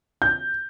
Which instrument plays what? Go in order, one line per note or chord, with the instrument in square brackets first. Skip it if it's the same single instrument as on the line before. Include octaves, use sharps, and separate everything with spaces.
[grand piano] G6